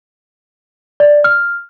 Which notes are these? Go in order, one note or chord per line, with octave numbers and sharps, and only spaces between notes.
D5
F6